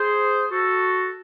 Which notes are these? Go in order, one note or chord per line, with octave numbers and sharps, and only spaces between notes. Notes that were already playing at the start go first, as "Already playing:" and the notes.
Already playing: G#4 C5
F#4 A4